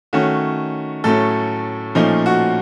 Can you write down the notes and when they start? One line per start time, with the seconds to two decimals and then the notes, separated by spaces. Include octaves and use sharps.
0.13 D#3 A3 C#4 F#4
1.04 A2 F#3 A3 C#4 A4
1.95 A#2 F3 A3 C#4 D#4
2.26 F#4